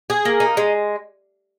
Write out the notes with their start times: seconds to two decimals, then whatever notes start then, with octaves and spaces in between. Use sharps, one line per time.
0.10 G#4
0.25 A#3
0.40 D#4
0.57 G#3